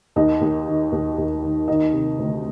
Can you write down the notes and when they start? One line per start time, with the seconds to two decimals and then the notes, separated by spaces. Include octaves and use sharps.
0.16 D#2 D#4
0.41 D#2
0.68 D#3
0.92 D#2
1.18 D#2
1.42 D#3
1.68 D#3 D#4
1.93 C3
2.19 D2